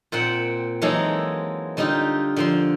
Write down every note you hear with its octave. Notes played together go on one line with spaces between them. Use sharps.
A#2 C4 F#5 G5
E3 F#3 G#3 A#3 D#4 A4
D3 G3 D#4 F4 G4
D3 F3 C6